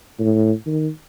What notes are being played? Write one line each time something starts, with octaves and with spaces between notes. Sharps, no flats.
A2
D#3